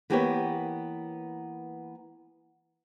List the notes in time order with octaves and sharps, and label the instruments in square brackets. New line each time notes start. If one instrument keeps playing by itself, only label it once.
[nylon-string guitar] E3 A#3 B3 G4 B4 C#5